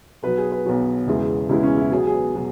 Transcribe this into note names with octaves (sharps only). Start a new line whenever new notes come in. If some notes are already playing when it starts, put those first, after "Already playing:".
B1 B2 F#3 B4
G#4
B4
B1 B2 F#3 F#4
E1 E2 C#3 E3 G#3
E1 E2 C#3 E3 G#3 E4
C#4
E4
B1 B2 F#3 G#4
G#4
B4
B2 F#3